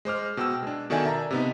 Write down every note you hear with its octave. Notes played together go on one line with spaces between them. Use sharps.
G#3 C5 D6 F6
B2 G5 E6
G#3 D4
B2 D#3 A4 D5 E5 G#5
E5 A5 A#5
C3 B3 D#4